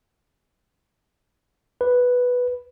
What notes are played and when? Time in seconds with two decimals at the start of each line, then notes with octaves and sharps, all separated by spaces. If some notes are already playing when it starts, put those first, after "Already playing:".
1.81 B4